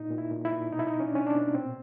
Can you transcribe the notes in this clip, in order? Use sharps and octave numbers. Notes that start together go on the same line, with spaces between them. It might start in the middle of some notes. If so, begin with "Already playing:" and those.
Already playing: A#2 D#4
A#2
E4
A#2
E4
A#2
B2 D#4
E4
D#4
B2
C#4
D4
B2 C#4
D4
B2
A#2 C4